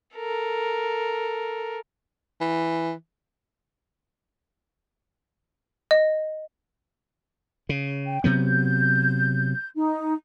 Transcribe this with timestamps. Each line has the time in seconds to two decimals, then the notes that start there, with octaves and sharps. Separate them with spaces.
0.15 A4 A#4
2.41 E3
5.91 D#5
7.69 C#3
8.07 G5
8.24 C3 F#3 B3 G6
9.76 D#4